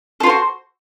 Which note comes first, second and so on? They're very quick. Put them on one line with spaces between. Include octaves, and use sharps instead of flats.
A4 F4 C5 F#4